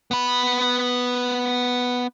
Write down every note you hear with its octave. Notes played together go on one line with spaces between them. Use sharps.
B3 B5